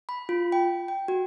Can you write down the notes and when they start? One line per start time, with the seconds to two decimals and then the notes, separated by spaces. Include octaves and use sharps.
0.09 B5
0.29 F4
0.52 G5
0.88 G5
1.08 F#4